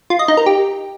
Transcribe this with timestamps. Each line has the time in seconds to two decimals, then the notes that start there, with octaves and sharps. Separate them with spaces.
0.10 F4
0.19 D#5
0.28 D#4
0.37 A#4
0.46 G4